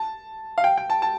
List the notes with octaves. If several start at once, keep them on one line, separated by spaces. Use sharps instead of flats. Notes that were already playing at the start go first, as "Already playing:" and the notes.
Already playing: A5
F5
G5
G5
A5
A5